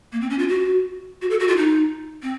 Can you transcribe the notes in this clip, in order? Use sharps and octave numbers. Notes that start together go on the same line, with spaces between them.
A#3
C4
C#4
F4
F#4
F#4
A4
F#4
F4
D#4
C4